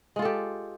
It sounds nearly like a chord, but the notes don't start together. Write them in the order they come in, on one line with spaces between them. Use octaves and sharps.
G#3 F4 A4 G4